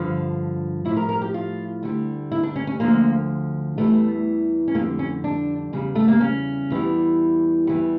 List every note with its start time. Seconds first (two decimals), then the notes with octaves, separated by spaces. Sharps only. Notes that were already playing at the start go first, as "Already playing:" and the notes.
Already playing: G2 D3 F3
0.85 A2 E4
0.89 F3
0.97 A#4
1.09 A#4
1.22 G4
1.34 F4
1.83 D2 D3 G3
2.32 E4
2.43 D4
2.56 C#4
2.67 C#4
2.80 D2 D3 F3 A#3
3.78 E2 E3 G3 A3
4.68 C#4
4.75 F2 D3 G3 A#3
4.99 C#4
5.24 D4
5.73 E2 C#3 G3
5.95 A3
6.08 A#3
6.21 C#4
6.70 E2 E3 G3
7.67 E2 E3 G3